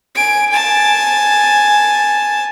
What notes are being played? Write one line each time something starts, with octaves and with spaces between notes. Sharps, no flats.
G#5 D7
G#5 A5